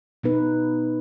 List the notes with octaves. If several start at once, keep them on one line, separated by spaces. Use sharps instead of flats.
B2 B3 D#4 B4